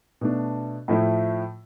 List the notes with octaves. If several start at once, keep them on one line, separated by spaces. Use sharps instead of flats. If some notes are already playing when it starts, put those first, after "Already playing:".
B2 A3 D4
A2 F3 A3 E4